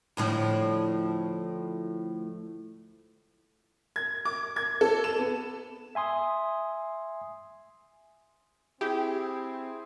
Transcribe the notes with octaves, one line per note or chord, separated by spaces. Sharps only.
D2 A2 F3
G#6
D6
G#6
A4
E7
B3
E5 G#5 C6 D#6
C4 E4 G4 G#4